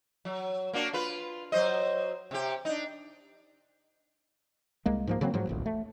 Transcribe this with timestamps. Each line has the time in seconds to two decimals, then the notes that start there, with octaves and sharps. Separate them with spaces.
0.25 F#3
0.73 A#3 D4 F#4
0.93 F4 B4
1.52 F#3 C5 D#5
2.31 C3 G4
2.65 D4 D#4
4.86 C2 G#3 A#3
5.07 G#2 F3 A#3
5.21 C#3 F#3 A#3 C4
5.34 G#2 F3 F#3
5.47 D#1 A1 D2
5.66 A3